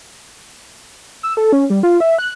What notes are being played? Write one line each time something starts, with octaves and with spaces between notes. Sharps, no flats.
E6
A4
C#4
G3
F4
E5
F#6